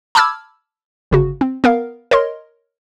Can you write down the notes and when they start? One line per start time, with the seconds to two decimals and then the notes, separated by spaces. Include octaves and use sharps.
0.15 A5 B5 D6 E6 F6 G#6
1.11 G1 C#3 F#4
1.41 C4
1.64 B3 A#4 F5
2.11 A#4 C#5 D#5 C6